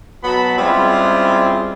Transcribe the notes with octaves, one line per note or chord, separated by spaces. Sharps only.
B2 F#3 B3 A5 B5
G3 G#3 C4 C#4 E4 F4